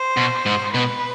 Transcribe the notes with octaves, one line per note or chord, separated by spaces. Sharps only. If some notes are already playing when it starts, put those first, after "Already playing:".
Already playing: C5
B2
G#2
B2 B4